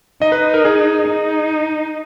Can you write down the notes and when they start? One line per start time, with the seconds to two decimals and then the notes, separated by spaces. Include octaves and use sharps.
0.22 D#4 D#5
0.32 B4
0.54 A#4
0.65 G#4
1.08 D#4